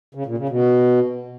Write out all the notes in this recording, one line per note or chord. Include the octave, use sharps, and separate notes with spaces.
C#3
A#2
C#3
B2